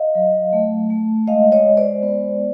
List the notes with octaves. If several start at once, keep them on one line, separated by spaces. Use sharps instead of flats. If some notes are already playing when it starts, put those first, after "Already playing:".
Already playing: D#5 F5
F#3
A3
A3
G#3 D#5 F5
C#5 D#5
G#3
C5 D5
B3